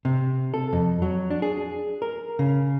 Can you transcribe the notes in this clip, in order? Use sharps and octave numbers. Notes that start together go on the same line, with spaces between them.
C3
A4
F2
F#3
D4
G#4
A#4
C#3